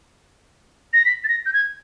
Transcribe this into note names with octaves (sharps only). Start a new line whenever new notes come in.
A#6
B6
A6
A#6
G6
G#6